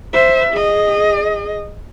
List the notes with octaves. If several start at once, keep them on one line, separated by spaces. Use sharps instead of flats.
C5 E5
G#4 D#5